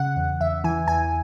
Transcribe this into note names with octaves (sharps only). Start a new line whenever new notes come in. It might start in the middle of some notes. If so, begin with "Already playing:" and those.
Already playing: C#3 F#5
E2
E2 E5
E3 G#5
E2 G#5